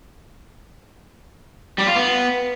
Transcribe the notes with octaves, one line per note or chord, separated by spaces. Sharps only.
G3
F4
B3